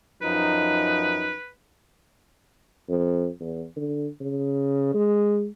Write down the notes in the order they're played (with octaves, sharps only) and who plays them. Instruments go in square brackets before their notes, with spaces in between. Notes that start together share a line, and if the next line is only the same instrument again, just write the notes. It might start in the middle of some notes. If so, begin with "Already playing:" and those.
[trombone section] F#2 F3 D#4 [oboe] B4
[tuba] F2
E2
D3
C#3
G#3